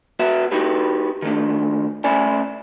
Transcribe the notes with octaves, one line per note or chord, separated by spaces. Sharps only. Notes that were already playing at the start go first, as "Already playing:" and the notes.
B3 F#4 E5
D#4 F#4 G4 B4
D#3 A3 D4
A2 C#4 E4 D5 G#5